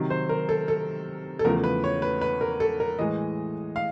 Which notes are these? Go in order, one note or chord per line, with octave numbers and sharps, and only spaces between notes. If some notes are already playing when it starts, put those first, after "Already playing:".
Already playing: C3 D#3 F#3
C5
A#4
A4
A4
A4
E2 C#3 F3 A3 A#4
B4
C#5
B4
B4
A#4
A4
A#4
A2 E3 G#3 D#5
F5